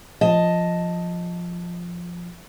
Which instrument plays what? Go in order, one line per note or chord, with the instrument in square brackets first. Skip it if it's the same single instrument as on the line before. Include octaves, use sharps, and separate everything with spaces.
[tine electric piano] F3 [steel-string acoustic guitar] D#5 A5